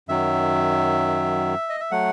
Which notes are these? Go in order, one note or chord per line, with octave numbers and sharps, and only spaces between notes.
F#2 D#3 F#3 E5
D#5
E5
F#3 A3 F#5